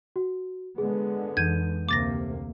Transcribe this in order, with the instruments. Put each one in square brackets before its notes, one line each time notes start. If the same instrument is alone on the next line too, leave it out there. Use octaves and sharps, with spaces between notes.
[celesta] F#4
[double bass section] D3 G#3 B3 [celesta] G#4
[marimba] F2 E3 [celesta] G6 D#7 [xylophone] G#6
[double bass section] D2 C3 A#3 [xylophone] D6 A6 A#6